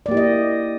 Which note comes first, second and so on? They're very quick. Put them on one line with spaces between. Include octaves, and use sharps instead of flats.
D5 A#3 G4 E4 D#5